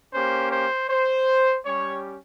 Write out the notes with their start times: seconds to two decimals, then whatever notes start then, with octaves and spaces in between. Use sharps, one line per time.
0.12 A#3 C#4 G4 C5
0.50 C5
0.88 C5
1.64 G3 C#4 G4 C#5